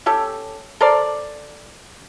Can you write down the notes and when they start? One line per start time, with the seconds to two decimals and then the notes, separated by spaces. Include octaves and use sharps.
0.06 C#4 G4 A4
0.81 A4 A#4 C5 D5